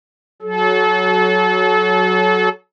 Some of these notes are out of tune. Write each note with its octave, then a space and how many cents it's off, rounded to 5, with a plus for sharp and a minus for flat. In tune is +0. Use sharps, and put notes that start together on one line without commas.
F#3 +0 A4 -35